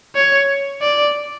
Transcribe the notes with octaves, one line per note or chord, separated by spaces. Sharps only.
C#5
D5